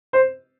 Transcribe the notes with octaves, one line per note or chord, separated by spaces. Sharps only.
C5